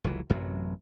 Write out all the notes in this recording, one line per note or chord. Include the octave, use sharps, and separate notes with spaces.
F1 C#2 E3 F#3
A1 F#2 C3 F#3